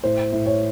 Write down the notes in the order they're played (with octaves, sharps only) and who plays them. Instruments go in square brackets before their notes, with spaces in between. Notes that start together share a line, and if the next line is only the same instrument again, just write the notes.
[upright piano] A2 C5
A2
C#5